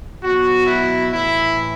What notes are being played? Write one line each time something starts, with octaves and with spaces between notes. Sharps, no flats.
B2 F#3 F#4
E4
A2 E3 E4